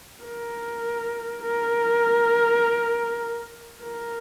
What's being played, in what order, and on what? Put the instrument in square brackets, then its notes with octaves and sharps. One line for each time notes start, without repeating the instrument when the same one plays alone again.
[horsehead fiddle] A#4
A#4
A#4